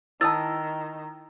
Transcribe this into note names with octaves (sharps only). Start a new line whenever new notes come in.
D#3 E4 C5 A5 D#6 E6 A6